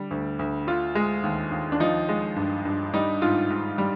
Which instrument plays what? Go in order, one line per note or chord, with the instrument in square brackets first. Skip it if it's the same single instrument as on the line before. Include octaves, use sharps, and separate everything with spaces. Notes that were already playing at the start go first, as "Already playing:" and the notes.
Already playing: [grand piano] D3 G3
D2
D2
D3 F4
G#3
D#2
D#2
D4
F3 D#4
G#3
G2
G2
G3 D#4
G#2 F4
G#2
G3